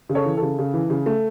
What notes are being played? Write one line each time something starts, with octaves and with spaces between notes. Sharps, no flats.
C#3
A4 C#5
E3
C#3 A4
C#3
E3
C#3
A3